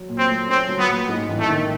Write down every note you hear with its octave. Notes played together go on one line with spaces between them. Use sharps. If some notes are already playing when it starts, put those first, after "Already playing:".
Already playing: F#3
A#2
C4
A3
C4 C#4
F#3
B3
A#2
G#2
A1
A3
D#3